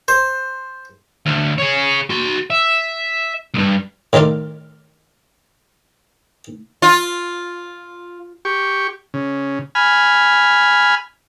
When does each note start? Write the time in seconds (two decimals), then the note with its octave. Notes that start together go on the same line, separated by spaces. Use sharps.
0.08 C5
1.26 D2
1.58 G#4 C#5
2.10 F#4 C6
2.50 E5
3.54 C2 G2
4.13 A2 D#3 F4 A#4 D5
6.82 F4
8.45 G4 C#6
9.14 C#3
9.75 G#5 B5 F6